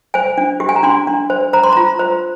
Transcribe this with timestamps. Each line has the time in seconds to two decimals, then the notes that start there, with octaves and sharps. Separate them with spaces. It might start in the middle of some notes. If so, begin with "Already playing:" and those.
0.14 C5 G#5
0.38 D4
0.60 G4
0.69 G#5
0.76 A#5
0.83 D4 C6
1.07 D4
1.30 C5
1.53 C5 A#5
1.64 C6
1.73 F4 A#5
1.99 C5